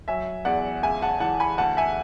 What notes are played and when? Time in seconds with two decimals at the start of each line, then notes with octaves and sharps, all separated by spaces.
0.08 F#3 E5 G#5
0.45 E2 D5 F#5
0.83 C#2 E5 G#5
1.02 F#5 A5
1.20 E3 F#5 A5
1.40 G#5 B5
1.58 D2 F#5 A5
1.77 E5 G#5